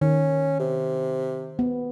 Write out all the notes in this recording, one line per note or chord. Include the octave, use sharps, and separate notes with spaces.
D#3 C#4
C3
B3